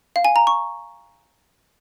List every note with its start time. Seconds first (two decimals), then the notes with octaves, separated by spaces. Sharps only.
0.16 F5
0.25 G#5
0.36 A#5
0.47 C#6